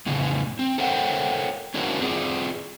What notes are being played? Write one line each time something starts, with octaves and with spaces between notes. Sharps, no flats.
F2 A2 C#3 E3
C4
A4 A#4 C5 C#5 F#5 G5
C#4 D4 E4 F#4 A#4 C5
C4 F4 G#4 D5